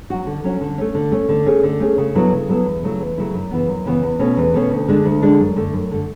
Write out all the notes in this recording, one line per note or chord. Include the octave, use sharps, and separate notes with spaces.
F#3 C#4 F#4
D3
F#3 C#4 F#4
D3
A3 C#4
D3
A3 C#4
D3
A3 C#4 G#4
D3
A3 C#4 G#4
C#3
F#3 B3 E4 A4
C#3
F#3 B3 E4 A4
E2
C#3 F#3 A3 E4
E2
C#3 F#3 A3 E4
F#2
C#3 E3 B3
F#2
C#3 E3 B3
E2
B2 A3 C#4
E2
B2 A3 C#4
D2
D3 G#3 D4
D2
D3 G#3 D4
F#2
D3 A3
F#2
D3 A3